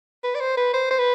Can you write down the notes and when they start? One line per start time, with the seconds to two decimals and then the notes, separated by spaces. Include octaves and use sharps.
0.24 B4
0.35 D5
0.41 C5
0.57 B4
0.74 C5
0.91 C5
0.99 B4